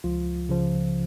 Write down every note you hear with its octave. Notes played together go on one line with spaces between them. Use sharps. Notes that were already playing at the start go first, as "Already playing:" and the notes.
C#2 F3 F4
C#3 F3